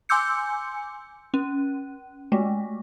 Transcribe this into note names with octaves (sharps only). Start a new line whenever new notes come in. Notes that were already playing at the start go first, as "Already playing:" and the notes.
G#5 C6 D6 E6 G6 C#7
C#4
G#3 A3